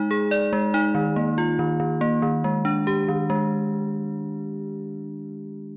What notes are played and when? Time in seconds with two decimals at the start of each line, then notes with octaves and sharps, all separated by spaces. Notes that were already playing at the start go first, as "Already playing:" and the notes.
Already playing: G#3 D#4
0.11 G#4
0.31 D5
0.53 G#3
0.74 D#4
0.95 D#3
1.16 A#3
1.38 F4
1.59 D#3
1.80 D#3
2.01 A#3
2.22 D#3
2.44 G#3
2.65 D4
2.87 G4
3.08 D#3
3.30 G#3